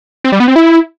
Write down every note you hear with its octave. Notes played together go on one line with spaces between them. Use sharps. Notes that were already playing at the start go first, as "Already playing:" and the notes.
C4
G3
B3
C4
E4